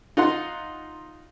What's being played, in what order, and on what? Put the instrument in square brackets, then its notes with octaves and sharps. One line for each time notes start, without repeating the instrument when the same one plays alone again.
[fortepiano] D#4 F4 F#5 C6